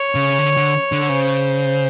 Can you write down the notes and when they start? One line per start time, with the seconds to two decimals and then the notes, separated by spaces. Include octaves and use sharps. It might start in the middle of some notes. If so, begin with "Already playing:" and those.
Already playing: C#5
0.15 C#3
0.39 D3
0.57 D3
0.92 D3
1.09 C#3 C5